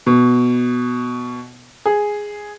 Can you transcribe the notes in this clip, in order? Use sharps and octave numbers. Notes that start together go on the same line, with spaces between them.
B2
G#4